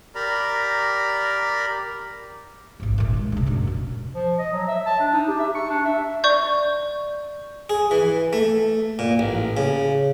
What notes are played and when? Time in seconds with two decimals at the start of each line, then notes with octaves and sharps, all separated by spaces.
0.15 G4 A#4 D5 A#5 B5
2.80 A1 G#2
2.98 A#2 D#3
3.13 G#3
3.32 C3 D4
3.46 F#2 A#2
3.67 D4
4.15 F3
4.39 D#5
4.52 F#3
4.68 E5
4.86 A5
5.00 D4
5.13 D#4
5.28 G4
5.40 E5
5.55 C#6
5.70 D4
5.86 E5
6.24 D5 C#6 G6
7.70 G#4
7.91 E3
8.33 A3
8.99 A#2
9.19 A1
9.57 C#3